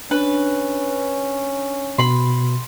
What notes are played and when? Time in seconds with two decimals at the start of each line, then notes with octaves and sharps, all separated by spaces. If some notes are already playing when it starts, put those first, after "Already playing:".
0.11 C#4 D4 B4
1.98 B2 B5 C6